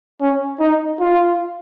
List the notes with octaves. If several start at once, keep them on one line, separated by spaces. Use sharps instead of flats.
C#4
D#4
F4